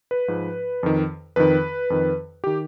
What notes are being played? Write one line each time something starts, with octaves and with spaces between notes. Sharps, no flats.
B4
G#2 F3
F2 D#3
F2 D#3 B4
F2 D#3
D#3 G4